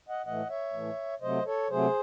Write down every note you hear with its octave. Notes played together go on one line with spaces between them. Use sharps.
D#5 F#5
A2 E3 A3 D#5 F#5
C#5 E5
A2 E3 A3
C3 F#3 A3 C5 D#5
A4 C#5
C3 F#3 A3 G#4 C5